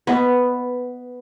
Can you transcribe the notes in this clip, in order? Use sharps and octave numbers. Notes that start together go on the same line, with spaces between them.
B3 B4 D#5 F#5 B5